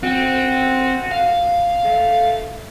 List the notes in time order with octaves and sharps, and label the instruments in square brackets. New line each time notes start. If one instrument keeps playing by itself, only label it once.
[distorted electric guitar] C4 [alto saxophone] F#4
[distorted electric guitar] F5
[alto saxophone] A3